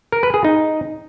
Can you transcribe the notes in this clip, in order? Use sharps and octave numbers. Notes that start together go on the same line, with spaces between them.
A#4
B4
G#4
D#4